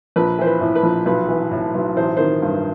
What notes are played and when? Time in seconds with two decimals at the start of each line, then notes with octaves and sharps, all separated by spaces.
0.16 A#1 B4
0.38 E3 C5
0.46 B4
0.61 A2
0.75 B4
0.83 A#1
1.05 B1 B4
1.28 E3
1.51 A2
1.74 B1
1.96 A1 C5
2.17 D#3 C5
2.42 G2